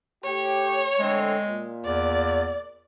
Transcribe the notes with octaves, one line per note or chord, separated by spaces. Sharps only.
A2 G4 C#5
D3 G#3 A3 C4
A#2
E2 D5